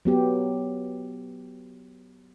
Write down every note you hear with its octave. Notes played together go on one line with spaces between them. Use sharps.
F#3 B3 G4